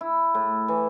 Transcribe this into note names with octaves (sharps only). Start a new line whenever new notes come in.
E4
A2
E3